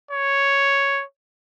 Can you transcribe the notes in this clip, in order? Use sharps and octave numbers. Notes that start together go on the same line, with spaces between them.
C#5